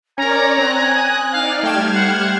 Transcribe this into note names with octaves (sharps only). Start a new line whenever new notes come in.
C#4 A#4 C#5 D5 G#5 A#5
C4 F#6
D#6
D#4 D5 F5
G3 A3 G5 F6 G#6 E7
C5 F#5